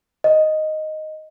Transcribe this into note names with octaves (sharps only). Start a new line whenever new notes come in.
D#5